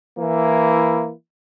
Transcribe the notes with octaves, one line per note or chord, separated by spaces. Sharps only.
E3 A#3 E4